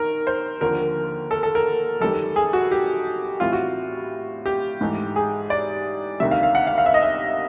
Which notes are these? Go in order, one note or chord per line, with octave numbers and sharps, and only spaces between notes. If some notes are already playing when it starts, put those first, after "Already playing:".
Already playing: D#3 A#4
C5
D#2 D3 F3 A#3 A#4
A4
A4
A#4
F#2 D#3 G3 A4
G#4
F#4
G4
A2 E3 G3 C4 F4
F#4
G4
G#2 E3 A3
G#4
D5
D2 C3 D#3 G3 E5
F5
F5
F#5
F5
F5
E5
D#5
E5